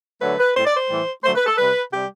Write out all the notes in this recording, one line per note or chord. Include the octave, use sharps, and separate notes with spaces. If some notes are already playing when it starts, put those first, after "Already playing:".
D3 F#3 A3 B4
B4
A2 G3 C5
D5
C5
A2 E3 G3
D3 F#3 A3 C5
B4
A4
C3 G3 B4
C3 G3 G4